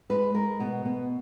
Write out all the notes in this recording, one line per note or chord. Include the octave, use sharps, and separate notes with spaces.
G#3 B4
G#3 A#4
B2 B3
B2 B3